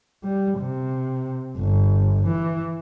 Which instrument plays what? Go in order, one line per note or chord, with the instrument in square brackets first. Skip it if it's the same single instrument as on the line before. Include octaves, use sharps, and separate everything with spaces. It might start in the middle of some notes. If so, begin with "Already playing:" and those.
[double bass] G3
C3
G1
E3